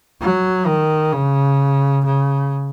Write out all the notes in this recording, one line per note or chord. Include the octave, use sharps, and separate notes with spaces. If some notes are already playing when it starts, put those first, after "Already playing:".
F#3
D#3
C#3
C#3